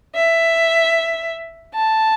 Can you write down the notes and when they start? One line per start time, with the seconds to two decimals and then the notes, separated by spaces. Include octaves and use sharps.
0.15 E5
1.75 A5